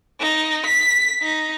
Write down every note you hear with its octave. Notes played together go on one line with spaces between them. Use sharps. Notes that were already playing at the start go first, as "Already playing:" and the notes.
D#4
B6
D#4